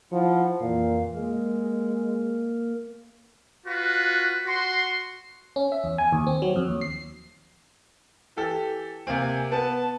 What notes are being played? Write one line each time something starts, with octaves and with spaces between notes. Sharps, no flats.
F3 E4 F#5
F2 A#2 E3 F5
G#3 A#3 A#4
F4 F#4 B4
F#4 C6
C#4
E5
E2
G#5
D#2
C4
F#3
F2
D#2
C7
E3 G4 A4
C3 A#3 C4 G#5
B3 A5